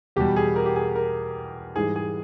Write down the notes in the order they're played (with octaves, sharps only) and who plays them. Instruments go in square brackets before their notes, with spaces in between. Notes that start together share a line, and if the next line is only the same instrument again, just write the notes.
[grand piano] E2 B2 G3 G4
G#4
A#4
G4
G#4
A#4
G#2 E3 G3 G#4
G#4